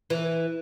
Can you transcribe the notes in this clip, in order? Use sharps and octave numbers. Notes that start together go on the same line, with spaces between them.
E3